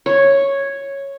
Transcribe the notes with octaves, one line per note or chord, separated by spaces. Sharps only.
C#5